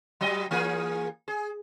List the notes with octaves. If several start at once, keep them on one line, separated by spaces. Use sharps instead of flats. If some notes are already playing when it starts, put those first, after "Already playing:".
F#3 G3 D#5
E3 A#3 G#4
G#4